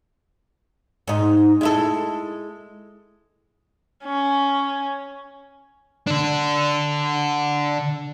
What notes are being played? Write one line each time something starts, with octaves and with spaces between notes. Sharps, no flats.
G#2 D#4
G#3 E4 A4
C#4
D3 D4